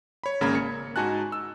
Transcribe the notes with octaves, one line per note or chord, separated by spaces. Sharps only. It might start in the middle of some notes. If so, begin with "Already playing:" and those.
C#5 B5
G#1 C#3 A#3 A#5 B5 G#6
C#7
G#2 D#4 F#4 G#5 A5 F#6
E6